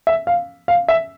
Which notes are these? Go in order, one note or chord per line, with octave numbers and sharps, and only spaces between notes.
E5
F5
F5
E5